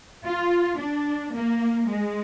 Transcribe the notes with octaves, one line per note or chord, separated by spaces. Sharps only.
F4
D4
A#3
G#3